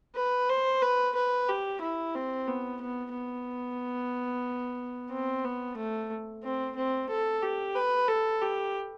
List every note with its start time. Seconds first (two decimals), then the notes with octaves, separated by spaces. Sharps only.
0.16 B4
0.49 C5
0.82 B4
1.15 B4
1.49 G4
1.81 E4
2.15 C4
2.48 B3
2.81 B3
3.13 B3
5.11 C4
5.45 B3
5.77 A3
6.43 C4
6.76 C4
7.09 A4
7.42 G4
7.75 B4
8.08 A4
8.41 G4